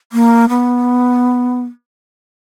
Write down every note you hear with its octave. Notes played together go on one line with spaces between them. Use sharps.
A#3
B3